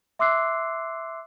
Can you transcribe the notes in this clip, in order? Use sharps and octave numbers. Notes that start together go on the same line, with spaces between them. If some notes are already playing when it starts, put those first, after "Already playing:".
E5 C6 D6 E6 F#6 C7